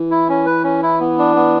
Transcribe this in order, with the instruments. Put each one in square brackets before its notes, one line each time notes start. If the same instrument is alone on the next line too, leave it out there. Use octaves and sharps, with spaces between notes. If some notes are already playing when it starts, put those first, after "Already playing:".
Already playing: [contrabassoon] E3
[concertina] E4
C#4
B4
C#4
E4
B3
D4
B3